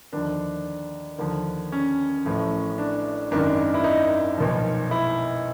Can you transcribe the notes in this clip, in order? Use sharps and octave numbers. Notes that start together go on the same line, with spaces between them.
D#2 D3 F3 D4
D#2 D3 F3
C#4
A1 A2 F3
D4
G#1 F#2 D#3 D4
E4
D#4
B1 A#2 F3
E4